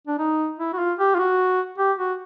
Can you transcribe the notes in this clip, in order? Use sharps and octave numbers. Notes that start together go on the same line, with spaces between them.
D4
D#4
E4
F#4
F4
G4
F4
F#4
G4
F#4